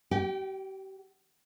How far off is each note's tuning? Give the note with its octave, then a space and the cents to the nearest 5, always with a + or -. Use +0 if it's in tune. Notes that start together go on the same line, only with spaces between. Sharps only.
G4 -35 G5 +0